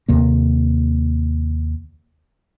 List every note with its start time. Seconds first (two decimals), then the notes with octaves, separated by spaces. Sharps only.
0.08 D#2 C3 A#3